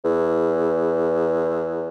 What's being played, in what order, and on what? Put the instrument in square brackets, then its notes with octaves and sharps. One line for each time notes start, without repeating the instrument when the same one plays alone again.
[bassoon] E2